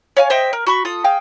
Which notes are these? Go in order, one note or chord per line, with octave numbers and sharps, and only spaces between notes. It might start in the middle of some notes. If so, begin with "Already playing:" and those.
C#5 F5 G#5
C5 D#5 E5 G5
A#4
F#4 B5 C#6
F4 A4 D#6
G#4 F5 G5